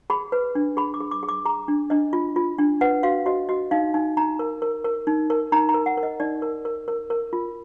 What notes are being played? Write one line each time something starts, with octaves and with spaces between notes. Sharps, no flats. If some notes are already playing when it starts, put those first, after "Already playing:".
G#4 B5
B4
D4
G#4 B5
D6
G#4
D6
G#4
D6
G#4 A#5
D4
D4 D#5
F4
F4
D4
B4 F#5
F#4 F5
F#4 D#5
F#4 D#5
D#4 F5
D#4 G#5
D#4 A#5
A#4
A#4
A#4
D#4
A#4
D#4 A#5
A#5
A#4
F#5
A#4
D#5
D#4 D5
A#4
A#4
A#4
A#4
F4